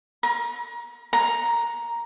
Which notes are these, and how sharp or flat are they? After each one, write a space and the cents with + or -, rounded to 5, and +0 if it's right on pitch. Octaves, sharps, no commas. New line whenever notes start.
A#5 +30
A#5 +5